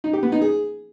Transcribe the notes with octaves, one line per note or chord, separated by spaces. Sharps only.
D#4
G4
B3
D#4
G#4